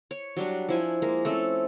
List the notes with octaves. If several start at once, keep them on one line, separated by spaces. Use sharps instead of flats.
C#5
F#3 G3 D4
F3 E4 G#5
G#3 A#3 A#4
A3 C4 C#4 A4